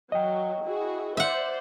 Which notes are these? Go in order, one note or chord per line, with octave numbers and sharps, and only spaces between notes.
F#3 D#5 G5
E4 F#4 G#4
C5 D5 E5 F#5